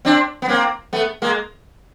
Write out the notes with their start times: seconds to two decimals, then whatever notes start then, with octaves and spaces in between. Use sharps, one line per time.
0.05 C4 D4
0.42 B3
0.48 A#3 C4
0.93 A3 B3
1.22 G#3 A#3